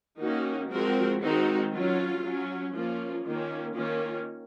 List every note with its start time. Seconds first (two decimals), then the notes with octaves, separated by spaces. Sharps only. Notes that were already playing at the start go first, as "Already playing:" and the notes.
0.20 D#3 A#3 C#4 D#4 F#4
0.72 F3 G#3 C4 F#4 A#4
1.22 D#3 G#3 C4 D#4 F#4
1.73 F#3 C#4 F4
2.23 F#3 C#4
2.74 F3 A#3 C#4 F4
3.25 D#3 A#3 C#4 F4
3.76 D#3 A#3 C#4 F4